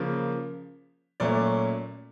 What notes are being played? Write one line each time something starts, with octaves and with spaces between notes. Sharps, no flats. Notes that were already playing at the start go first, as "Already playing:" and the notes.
Already playing: C#3 F3 A#3
A#2 F#3 A3 C#4 D5